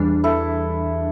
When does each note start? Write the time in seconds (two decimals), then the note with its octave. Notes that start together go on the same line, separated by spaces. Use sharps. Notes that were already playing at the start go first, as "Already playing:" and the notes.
Already playing: E2 E3 G3 D4
0.24 E4 A4